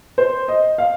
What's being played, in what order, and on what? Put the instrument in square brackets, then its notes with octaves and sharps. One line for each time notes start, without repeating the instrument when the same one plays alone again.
[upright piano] C5
D#5
F5